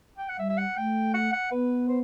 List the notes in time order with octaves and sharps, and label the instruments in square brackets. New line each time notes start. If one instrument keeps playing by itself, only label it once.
[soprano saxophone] G5
F#5
[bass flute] G3 [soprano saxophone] E5
[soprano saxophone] E5
F#5
[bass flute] A3 [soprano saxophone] G5
[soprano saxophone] F#5
F#5
[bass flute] B3 [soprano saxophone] B4
[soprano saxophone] C5